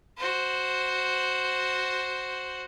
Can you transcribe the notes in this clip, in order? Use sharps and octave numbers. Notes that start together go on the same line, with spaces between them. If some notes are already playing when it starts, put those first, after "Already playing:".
F#4 C5